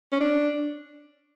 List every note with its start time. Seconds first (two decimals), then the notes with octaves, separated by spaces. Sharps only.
0.12 C#4
0.20 D4